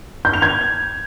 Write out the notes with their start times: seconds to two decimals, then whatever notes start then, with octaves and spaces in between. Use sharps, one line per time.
0.25 G6
0.34 F7
0.42 G#6